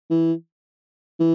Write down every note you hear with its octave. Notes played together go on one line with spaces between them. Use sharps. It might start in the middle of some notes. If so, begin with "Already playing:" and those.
E3
E3